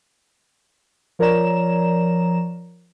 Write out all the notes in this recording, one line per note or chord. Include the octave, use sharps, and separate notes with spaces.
F3 A#4 C#5 D5 A#5 E7